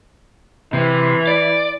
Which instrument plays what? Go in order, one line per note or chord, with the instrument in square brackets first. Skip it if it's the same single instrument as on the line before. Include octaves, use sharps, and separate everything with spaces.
[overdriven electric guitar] C3 [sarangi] E3
[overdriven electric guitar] D5